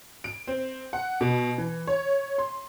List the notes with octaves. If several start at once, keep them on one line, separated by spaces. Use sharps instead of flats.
D7
C4
F#5
B2
E3
C#5
C6